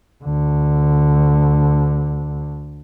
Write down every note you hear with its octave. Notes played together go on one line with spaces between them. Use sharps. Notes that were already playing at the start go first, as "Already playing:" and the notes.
D2 D3